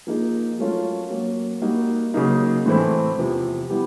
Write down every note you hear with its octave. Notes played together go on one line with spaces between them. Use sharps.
F3 A#3 D#4 G#4
F#3 A3 C#4 F4 A#4
F#3 A#3 C#4
G3 A#3 D#4 F#4
C#3 F#3 A#3 D#4
A2 E3 A3 C4 E4
E2 C3 F3
G3 B3 E4 G4